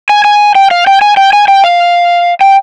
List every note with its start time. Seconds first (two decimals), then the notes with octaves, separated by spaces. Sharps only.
0.09 G#5
0.25 G#5
0.55 G5
0.71 F5
0.87 G5
1.01 G#5
1.17 G5
1.33 G#5
1.48 G5
1.64 F5
2.41 G5